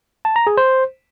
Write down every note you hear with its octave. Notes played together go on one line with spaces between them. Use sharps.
A5
A#5
G#4
C5